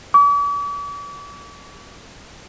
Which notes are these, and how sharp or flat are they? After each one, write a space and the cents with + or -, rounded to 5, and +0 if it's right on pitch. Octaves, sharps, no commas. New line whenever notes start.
D6 -45